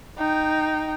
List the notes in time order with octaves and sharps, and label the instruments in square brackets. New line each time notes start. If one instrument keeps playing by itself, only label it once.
[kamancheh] D#4 G5